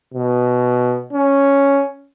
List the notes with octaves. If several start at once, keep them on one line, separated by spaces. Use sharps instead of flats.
B2
C#4